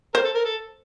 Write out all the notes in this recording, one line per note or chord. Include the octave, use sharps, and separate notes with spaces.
A#4 C5
A4
A#4
A4